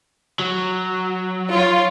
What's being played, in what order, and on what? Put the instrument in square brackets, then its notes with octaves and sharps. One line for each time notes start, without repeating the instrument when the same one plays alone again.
[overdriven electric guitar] F#3
[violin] F4 C#5